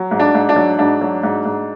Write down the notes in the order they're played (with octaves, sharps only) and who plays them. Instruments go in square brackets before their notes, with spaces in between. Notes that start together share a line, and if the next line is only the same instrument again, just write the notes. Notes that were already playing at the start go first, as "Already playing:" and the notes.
Already playing: [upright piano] F#3
G#2
D4
G#2
D4
F#3
G#2 D4
F#3
G#2
G#2